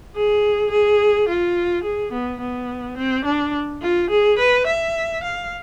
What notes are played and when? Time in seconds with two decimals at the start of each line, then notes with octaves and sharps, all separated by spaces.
0.15 G#4
0.71 G#4
1.29 F4
1.84 G#4
2.13 B3
2.41 B3
2.98 C4
3.25 D4
3.82 F4
4.10 G#4
4.38 B4
4.67 E5
5.24 F5